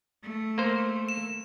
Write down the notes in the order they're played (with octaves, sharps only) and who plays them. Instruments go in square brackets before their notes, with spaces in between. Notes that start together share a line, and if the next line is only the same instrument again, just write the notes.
[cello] A3
[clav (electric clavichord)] A#3 C5
[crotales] E7